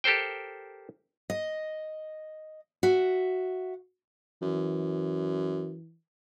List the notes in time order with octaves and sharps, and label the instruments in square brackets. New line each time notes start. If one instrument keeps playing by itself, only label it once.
[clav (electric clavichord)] G4 A4 A#4 C5 G5
[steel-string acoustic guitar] D#5
F#4 E5
[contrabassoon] F#2 [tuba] E3